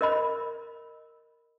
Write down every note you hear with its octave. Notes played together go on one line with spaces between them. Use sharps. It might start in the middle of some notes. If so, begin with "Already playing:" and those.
A#4 D#5 B5